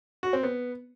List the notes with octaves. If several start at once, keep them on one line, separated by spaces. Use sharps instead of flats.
F#4
C4
B3